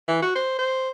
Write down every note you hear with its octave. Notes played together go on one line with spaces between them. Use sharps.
E3
F#4
C5
C5